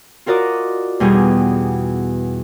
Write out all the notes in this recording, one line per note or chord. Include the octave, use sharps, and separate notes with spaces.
F4 F#4 A#4 D5 D#5
E2 B2 G3 G4 G#4